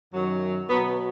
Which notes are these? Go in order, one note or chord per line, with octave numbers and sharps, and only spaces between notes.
F#2 D#3 F#3
B2 F#3 B3